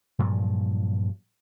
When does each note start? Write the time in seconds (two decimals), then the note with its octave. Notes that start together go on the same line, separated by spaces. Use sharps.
0.19 G2 A#2 F3 F#3